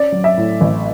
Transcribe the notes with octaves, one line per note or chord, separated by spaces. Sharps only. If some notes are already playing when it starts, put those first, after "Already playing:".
Already playing: C#4 D5
F#3
E5
A2
A1